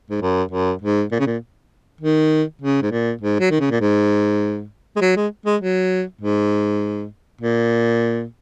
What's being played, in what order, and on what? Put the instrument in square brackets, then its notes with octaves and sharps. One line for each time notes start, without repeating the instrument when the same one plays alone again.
[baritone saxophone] G#2
F#2
F#2
G#2
A#2
C#3
A#2
D#3
C#3
G#2
A#2
G#2
F#3
D#3
C#3
A#2
G#2
G#3
F#3
G#3
G#3
F#3
G#2
A#2